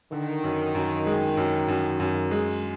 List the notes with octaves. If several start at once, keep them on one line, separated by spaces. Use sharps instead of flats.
D3 D#3
F#2
F#2
G#3
F#2
F#2
F#2
G#3